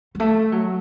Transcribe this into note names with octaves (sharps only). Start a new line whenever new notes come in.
F#3
A3
F#3